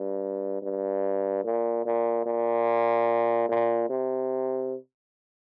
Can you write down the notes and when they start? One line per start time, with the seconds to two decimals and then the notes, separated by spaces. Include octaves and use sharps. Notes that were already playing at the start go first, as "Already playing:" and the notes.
Already playing: G2
0.62 G2
1.44 A#2
1.85 A#2
2.26 A#2
3.49 A#2
3.90 C3